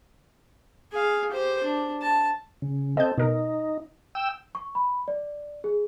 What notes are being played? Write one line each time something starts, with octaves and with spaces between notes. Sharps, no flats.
G#4 F5
G4 C5
D4
A5
C#3
C4 A4 D#5 G6
B2 D#4 A#4
G5 E6
C#6
B5
D5
G#4